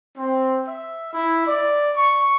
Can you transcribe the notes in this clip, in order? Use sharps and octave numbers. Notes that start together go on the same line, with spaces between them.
C4
E5
E4
D5
C#6